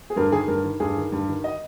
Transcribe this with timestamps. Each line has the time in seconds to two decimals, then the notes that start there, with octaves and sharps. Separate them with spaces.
0.10 G#4
0.16 G2 A#4
0.32 D#3 G#4
0.47 G2 A#4
0.64 D#3
0.80 G2 G#4
0.96 D#3
1.12 G2
1.28 D#3
1.44 D#5